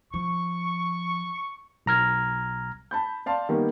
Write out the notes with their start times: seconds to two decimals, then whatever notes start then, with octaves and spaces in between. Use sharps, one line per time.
0.14 F3 C#6
1.86 B1 A#5 F6 G#6
2.91 A5 B5 G6
3.26 D5 F5 A5 C6
3.49 D#3 G3 A#3 B3